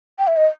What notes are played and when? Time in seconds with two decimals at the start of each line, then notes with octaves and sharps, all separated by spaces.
0.19 G5
0.27 E5
0.37 D#5